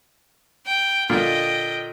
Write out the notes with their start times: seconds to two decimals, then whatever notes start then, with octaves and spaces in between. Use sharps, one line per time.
0.66 G5
1.10 A#2 D3 F4 D#5 G5